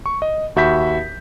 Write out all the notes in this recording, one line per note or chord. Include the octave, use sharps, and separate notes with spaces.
C#6
D#5
D#2 F#4 E5 B5 G6 B6